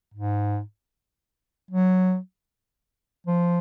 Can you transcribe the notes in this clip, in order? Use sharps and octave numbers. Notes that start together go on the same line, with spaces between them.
G#2
F#3
F3